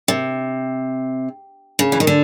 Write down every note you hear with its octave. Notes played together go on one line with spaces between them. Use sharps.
C3
C#3
E3
D#3
D3